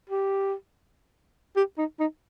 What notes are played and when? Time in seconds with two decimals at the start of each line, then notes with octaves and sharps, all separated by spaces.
0.10 G4
1.56 G4
1.78 D#4
2.00 D#4